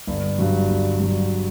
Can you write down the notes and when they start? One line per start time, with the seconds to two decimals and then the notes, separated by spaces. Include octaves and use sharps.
0.07 G1
0.38 G2 F#3
0.69 G1
0.99 G2 F#3